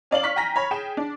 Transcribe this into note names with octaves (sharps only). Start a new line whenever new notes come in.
C#4 D5 F5 F#7
C#6 F6 B6
G5 G#5 A#5 A#6 B6
C#5 B5
G#4 G5 E7
D4